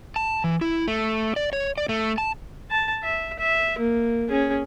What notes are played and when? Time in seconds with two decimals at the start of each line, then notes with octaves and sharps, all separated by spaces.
0.16 A5
0.44 E3
0.61 E4
0.87 A3
1.36 D5
1.53 C#5
1.78 D5
1.89 A3
2.18 A5
2.71 A5
3.03 E5
3.39 E5
3.79 A#3
4.29 C#4 G#4